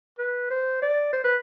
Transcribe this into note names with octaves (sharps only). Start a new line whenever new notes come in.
B4
C5
D5
C5
B4